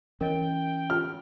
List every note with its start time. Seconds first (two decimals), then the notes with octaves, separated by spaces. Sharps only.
0.21 E3 C#4 A#4 C#5 D#5 G5
0.90 F4 F6